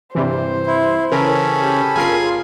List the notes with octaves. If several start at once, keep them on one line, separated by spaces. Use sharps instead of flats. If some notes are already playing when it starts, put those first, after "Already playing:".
G2 C3 E3 C5
E4
C#3 E3 C#4 A4 A#4 B5
G4
G1 F4 G#4 A#4 C7